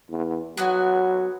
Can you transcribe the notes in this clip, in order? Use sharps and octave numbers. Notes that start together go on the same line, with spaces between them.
E2
F#3 B3 F#4 G#5